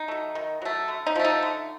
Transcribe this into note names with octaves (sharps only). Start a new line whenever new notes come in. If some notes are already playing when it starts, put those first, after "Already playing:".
Already playing: D#4
F#3 A3
D#3
F#3 A3
D3
D#4
F3 A3
D#4
D3